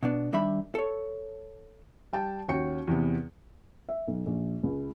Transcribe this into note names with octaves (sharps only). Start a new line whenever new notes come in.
B2 B3 D4
D#3 G3 D4 E5 B5
A4 C#5
G3 G5 A5
D#2 C#4 F#4 G5 C#7
E2 C3 B3
E5
B1
A#1
C#2